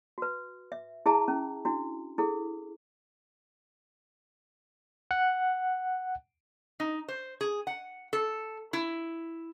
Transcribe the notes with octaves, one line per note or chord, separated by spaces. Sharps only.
F#4 B4
E5
E4 G#4 E5 A5 A#5
C#4
D4 E4 F#4
E4 G#4 A4
F#5
D#4
C5
G#4
F#5
A4
E4